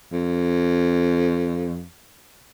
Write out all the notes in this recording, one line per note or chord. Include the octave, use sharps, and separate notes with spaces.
F2